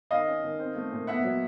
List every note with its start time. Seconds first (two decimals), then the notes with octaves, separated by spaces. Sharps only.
0.11 D#3 D#5 F5
0.27 C#4
0.43 D#3
0.59 C4
0.75 A3
0.92 A#2
1.07 B3 E5 F#5
1.23 F#3